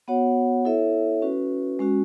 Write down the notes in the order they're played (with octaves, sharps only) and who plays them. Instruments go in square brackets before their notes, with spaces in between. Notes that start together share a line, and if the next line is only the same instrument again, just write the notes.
[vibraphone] B3 F#4 C#5 F#5
E4 A4 C#5 E5
C#4 F#4 B4
G#3 C#4 F#4